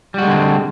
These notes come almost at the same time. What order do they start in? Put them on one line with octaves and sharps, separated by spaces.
G3 F#4 G#3 D3 C4